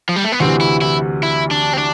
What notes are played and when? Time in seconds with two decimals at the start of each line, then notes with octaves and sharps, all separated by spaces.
0.09 F3
0.16 G3
0.24 A3
0.32 B3
0.40 D2 C3 E3 C4
0.61 E4
0.82 E4
1.23 E4
1.51 D4
1.73 C4
1.78 D4